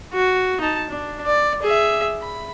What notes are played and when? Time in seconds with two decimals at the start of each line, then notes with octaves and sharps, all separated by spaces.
0.13 F#4
0.61 D#4 A5
0.90 D4
1.26 D5
1.62 G#4 E5
2.22 B5